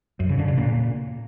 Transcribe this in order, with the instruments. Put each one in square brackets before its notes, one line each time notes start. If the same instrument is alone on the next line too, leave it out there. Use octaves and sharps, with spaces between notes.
[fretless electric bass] F#2
C#3
D3
C#3
A#2